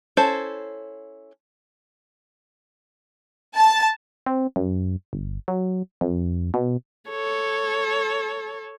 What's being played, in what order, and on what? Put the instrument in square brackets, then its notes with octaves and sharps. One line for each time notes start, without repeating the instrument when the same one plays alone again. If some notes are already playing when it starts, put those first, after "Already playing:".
[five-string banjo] C#4 E4 A4 C5
[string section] A5
[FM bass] C4
F#2
G1
F#3
F2
B2
[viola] A4 C#5